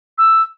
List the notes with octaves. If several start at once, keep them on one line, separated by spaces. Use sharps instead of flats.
E6